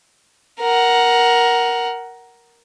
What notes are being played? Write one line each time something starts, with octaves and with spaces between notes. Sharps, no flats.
A#4 F#5